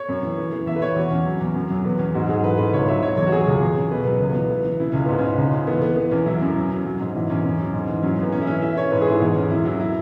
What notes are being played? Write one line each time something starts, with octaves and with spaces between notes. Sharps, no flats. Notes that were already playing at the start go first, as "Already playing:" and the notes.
Already playing: C#5
F#2
E3
E3
E3
E2 E5
B4
E3 C#5
E2 F#4
E2 C#4
F#3
E2
F#2
F#3
E2 B3
E2 C#4
G#2 F#4
F#3 G#4
E3 B4
G#2 B4
B4
C#2 C#5
F#3 E5
F#3 C#5
E2 C#5
F#4
F#3 G#4
C#2 G#4
E2
C#3
B2 B4
F#3 B3
C#2
B3
E3
E3
E3
C#3 E4
C#2 C#4
G#2 B3
G#2 C#4
C#2
C#3
E3 B3
E3 B3
E3 B3
E2 C#4
F#3 E4
F#2 C#4
F#3
F#3
F#3
G#2
E2 E4
E2 C#4
F#2
F#3
G#2
E3
F#3 C#4
F#2 B3
E3 C#4
E4
E3 C#4
E3 E5
E3 C#5
G#2 B4
G#4
G#2 E4
E2 B3
E2 C#4
F#2 E4
F#3 E4
E4